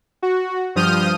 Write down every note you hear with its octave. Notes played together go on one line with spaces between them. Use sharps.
F#4
G2 F3 D#6 F6 G6 D#7